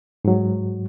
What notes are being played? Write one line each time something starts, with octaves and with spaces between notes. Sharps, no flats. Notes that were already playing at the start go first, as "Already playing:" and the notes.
G#2 F#3